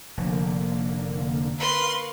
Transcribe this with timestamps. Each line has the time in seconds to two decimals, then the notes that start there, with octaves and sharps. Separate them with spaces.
0.17 F1 D3 A#3
1.58 A#4 B4 F5 C6 C#6